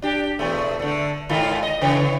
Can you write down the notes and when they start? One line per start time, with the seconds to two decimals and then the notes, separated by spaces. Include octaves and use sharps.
0.02 D4 G4
0.39 E2 B2 A3
0.79 D3 A3
1.29 G#2 D#3 F4
1.63 D#5
1.81 C#3 E3 C#5